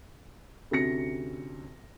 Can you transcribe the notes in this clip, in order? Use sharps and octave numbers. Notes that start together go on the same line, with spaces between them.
D2 C3 C#4 A#6 C#7